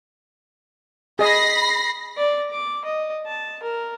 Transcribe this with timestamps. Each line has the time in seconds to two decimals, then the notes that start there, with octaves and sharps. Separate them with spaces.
1.19 G#4 D#5 B5 A#6 C7
2.17 D5
2.51 D6
2.85 D#5
3.27 A5
3.63 A#4